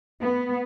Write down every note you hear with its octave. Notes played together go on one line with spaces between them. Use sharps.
B3